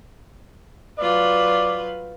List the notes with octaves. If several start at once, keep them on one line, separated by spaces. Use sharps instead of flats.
F#3 F4 B4 D5